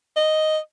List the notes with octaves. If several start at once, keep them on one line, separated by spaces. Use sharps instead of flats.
D#5